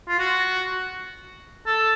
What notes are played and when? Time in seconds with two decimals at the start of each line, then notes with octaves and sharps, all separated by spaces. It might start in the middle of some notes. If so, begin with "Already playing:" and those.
0.09 F4
0.19 F#4
1.66 A4